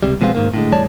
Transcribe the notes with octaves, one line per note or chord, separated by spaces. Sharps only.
C#2 C3 G3
B2 F3 G#3 B3 C4 F4
G#2 D#3 A#3
A2 D3 G#3
E2 A2 G3 C#5 D5 A5